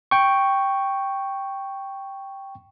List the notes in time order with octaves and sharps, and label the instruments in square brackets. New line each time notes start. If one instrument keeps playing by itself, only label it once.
[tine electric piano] G5 C#6